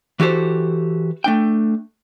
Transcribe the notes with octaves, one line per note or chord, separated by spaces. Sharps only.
E3 F#4 G4 A4 C5
A3 D4 G5